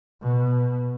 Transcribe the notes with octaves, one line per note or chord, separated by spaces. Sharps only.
B2